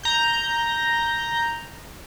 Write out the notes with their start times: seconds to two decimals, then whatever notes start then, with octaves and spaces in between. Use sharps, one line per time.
0.03 A#5 G6